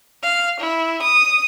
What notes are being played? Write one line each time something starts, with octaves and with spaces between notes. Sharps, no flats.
F5
E4
D#6